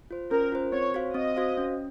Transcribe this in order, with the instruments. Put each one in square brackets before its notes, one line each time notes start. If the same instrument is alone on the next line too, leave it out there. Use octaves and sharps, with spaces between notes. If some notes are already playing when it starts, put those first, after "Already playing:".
[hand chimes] F4 C5
[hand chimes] C#4 [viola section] A#4
[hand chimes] F4 C5
[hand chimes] C4 [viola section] C#5
[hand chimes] F#4 C5 F5
[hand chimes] C4 [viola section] D#5
[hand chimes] F#4 C5 F5
C#4